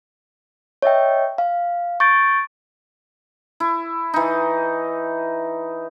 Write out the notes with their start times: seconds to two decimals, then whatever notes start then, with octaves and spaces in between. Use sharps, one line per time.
0.82 C#5 D#5 E5 G5
1.38 F5
2.00 C#6 G6 A6 D7
3.60 E4
4.14 E3 D#4